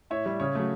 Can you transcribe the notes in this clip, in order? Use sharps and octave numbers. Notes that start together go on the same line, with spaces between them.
A2 C#5 E5
G3 C#5
C#3 C#5
F#3 A3